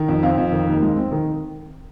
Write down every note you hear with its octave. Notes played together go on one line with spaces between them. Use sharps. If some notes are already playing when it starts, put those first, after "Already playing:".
Already playing: D#3
F2
C4 F5
F2
D#3
D#2
G#3
C4
D#3